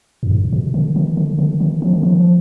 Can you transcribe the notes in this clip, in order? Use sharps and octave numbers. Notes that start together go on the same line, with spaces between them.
F#2
G#2
B2
D3
D#3
D3
D3
D#3
F3
D#3
F3